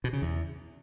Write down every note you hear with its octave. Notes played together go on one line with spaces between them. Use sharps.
B2
C#3
E2